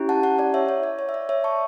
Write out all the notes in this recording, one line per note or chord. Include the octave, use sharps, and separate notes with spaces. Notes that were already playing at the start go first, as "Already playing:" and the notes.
Already playing: C#4 E4 G4
F#5 A5
F#5 A5
D5 F#5
C#5 E5
C#5
D5
C#5
E5
D5
C#5 E5
A5 C#6